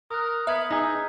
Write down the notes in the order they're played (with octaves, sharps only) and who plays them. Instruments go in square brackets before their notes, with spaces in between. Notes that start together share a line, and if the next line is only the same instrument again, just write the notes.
[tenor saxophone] A#4 [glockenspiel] D#6 F#6
[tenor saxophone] B3 [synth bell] E5 [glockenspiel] F6 G#6 B6
[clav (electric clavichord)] D#4 G#5 [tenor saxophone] G#4 [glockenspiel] A#5 E6 G6